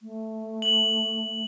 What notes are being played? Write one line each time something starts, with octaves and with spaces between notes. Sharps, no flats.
A3
F#7